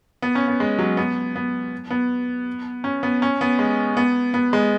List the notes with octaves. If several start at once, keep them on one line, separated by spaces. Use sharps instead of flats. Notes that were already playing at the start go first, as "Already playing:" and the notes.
B3
C#4
B3
G#3
F#3
B3
B3
B3
C#4
B3
C#4
B3
G#3
B3
B3
G#3